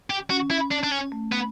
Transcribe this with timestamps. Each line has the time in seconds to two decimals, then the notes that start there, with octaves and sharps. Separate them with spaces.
0.10 G4
0.30 C#4 F#4
0.51 E4
0.71 D4
0.84 D4
0.92 C#4
1.12 A3
1.32 B3